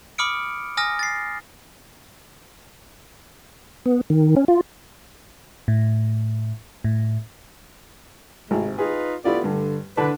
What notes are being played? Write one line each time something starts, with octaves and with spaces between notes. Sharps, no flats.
B5 D6 D#6 F6 C#7 D7
G#5 D#6 F6 A#6
A6 C7
B3
D#3
C#4
F4
A2
A2
G#1 A2 C3 G#3
D#4 F4 G#4 B4
A3 B3 E4 F4 G4 D5
G2 D3
D3 D4 B4